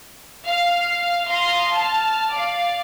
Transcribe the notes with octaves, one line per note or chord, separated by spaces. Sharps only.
F5 F6
F5 A#5 C6 D#6
A5 F6
D5 F5